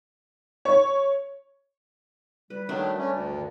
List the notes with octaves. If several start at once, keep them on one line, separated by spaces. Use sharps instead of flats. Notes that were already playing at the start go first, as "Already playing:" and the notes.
C#5
G3 B4
D#3 F#3 A3 D4
A3 C#4
D2
G2 D3 D#3